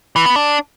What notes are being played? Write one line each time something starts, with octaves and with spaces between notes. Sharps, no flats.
E3
B3
D4